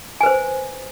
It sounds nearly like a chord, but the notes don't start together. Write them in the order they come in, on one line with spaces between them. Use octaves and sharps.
G#5 B4 C5